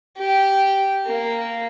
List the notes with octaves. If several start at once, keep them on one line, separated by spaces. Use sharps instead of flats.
G4
A#3